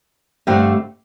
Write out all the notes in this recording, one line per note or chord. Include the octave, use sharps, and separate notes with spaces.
G2 D3 A3 C4 G4